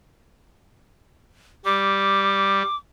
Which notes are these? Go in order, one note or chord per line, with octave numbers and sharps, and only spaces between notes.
G3 D6